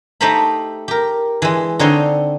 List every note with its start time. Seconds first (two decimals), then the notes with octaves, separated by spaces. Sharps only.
0.21 A3 D#4 G4 C5 A#5 B5
0.88 G4 A#4
1.42 E3 G#3
1.79 D3 C4 D#4 C#5 D#5 C6